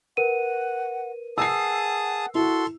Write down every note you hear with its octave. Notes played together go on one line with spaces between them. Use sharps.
A#4 B4 F#5 D#7
G#4 F#5 A5 D#6 E6 C7
E4 F#4 A4 C6